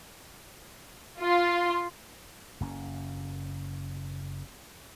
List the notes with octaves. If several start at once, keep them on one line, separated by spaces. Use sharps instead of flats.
F4 C6
F#1 A#3 C#4